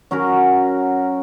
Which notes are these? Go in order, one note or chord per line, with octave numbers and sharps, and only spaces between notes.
F#3 C#4 F#4 A#4